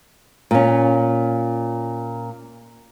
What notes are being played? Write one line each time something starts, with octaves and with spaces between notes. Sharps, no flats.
A#2 C#4